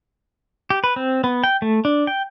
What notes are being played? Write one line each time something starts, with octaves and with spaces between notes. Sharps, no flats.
G4
B4
C4
B3
G5
A3
D4
G5